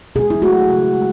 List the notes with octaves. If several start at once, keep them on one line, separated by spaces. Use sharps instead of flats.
B2 G#4
E4
A3 F#4
C#3
G#3